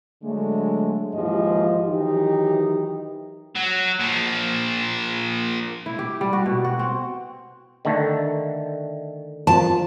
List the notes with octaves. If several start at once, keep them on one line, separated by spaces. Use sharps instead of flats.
D3 F#3 G#3 A3
D#2 G#2 E3 F3 G4 D#5
D#3 E3 F#3 D#4 G4
F#3
A#2 F3
E4
G4
G3
F#4
B2
F#4
C4
D3 D#3 A3
F3 A5